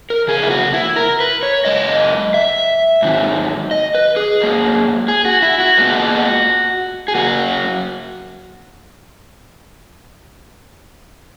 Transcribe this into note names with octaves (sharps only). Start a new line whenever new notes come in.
A#4
E2 C#3 G#4
E4
F#4
E4
A#4
B4
C#5
F#2 C#3 G#3 D#5
E5
G#2 D#3 F#3
D#5
B4
G#4
G#2 F#3 A#3
G#4
F#4
E4
F#4
A#2 G#3 B3
G#4
C#3 F#3 A#3 F#4